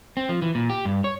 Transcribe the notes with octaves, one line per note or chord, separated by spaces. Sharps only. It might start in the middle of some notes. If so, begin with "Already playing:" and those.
C4
F3
E3
A#2
G4
G2
C#5